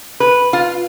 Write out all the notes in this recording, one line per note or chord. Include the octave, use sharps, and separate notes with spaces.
B4
F4